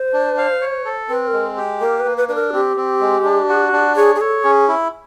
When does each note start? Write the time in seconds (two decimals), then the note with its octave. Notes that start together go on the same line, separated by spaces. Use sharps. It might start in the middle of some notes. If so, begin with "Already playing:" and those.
Already playing: C5
0.13 D4
0.38 F5
0.61 C#5
0.85 A4
1.09 C4 B4
1.28 A#4
1.33 G#3
1.57 G4
1.81 A#3 A#4
2.00 B4
2.05 A#3
2.17 B4
2.28 D4 B4
2.35 A#4
2.53 C4 G4
2.77 C4
3.01 G#3
3.25 D4
3.49 F#4
3.72 D4
3.96 G#4 C#5
4.15 G#4
4.21 A4 C#5
4.44 C#4 G#4
4.68 E4